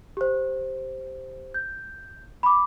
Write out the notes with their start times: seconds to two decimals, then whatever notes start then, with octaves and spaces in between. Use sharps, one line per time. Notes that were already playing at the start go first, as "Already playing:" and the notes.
0.17 G4 C5
1.54 G6
2.43 B5 D6